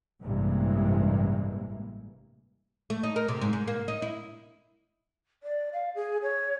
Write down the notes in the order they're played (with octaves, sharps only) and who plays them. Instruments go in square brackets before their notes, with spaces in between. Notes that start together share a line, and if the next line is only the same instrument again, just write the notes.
[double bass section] A1 G2 C3 E3 G#3 A#3
[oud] A3
D#4
A#4
C3
G#2
G#2
A#3
D#4
E4
[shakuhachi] D5
F5
G#4
C#5